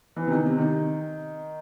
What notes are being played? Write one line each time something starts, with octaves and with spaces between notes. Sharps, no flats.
E3
C3
D#3
C3
D#3